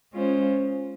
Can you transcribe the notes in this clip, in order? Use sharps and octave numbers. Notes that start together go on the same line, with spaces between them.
G#3 C#4 F4 C5